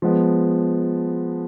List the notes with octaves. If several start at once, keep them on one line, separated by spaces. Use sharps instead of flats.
F3 G#3 B3